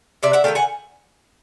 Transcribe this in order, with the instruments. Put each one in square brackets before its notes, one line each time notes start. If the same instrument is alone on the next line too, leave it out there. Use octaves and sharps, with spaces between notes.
[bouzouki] C3 D5 E5
E5 F#5
D#3 F#3 A3 F5 G5
F#5 G#5